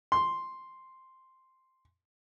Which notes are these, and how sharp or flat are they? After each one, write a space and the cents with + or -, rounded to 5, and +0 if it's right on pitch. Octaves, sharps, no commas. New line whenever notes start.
C6 +0